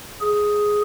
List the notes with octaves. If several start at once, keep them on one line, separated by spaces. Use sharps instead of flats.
G#4